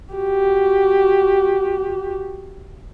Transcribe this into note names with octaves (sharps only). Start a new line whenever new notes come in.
F#4 G4